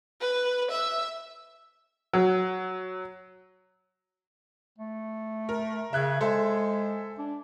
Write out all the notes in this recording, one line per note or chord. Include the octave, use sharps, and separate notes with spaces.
B4
E5
F#3
A3
A#4
C#3 E5 F#6 G#6
G#3 A4 C5 E5
D4